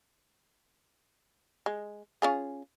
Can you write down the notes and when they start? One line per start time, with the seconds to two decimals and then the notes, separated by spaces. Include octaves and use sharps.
1.66 G#3
2.22 C#4 F4 G#4